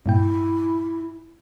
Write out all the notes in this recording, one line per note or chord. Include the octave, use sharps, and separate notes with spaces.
G2 A#2 E4 G5